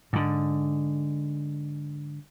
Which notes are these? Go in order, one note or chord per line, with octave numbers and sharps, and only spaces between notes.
G#2 D3